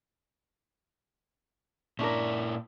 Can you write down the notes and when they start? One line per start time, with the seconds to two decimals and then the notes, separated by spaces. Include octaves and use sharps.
1.99 A#2 C#4 D4 E4 A#4